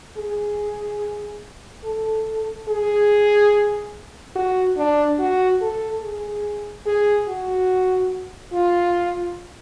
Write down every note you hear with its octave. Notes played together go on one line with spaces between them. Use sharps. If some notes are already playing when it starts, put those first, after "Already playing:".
G#4
A4
G#4
F#4
D4
F#4
A4
G#4
G#4
F#4
F4